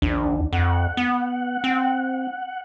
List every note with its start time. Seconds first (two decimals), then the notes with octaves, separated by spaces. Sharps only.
0.02 A#1 D#2 D4
0.53 F2 F#5
0.97 B3
1.64 C4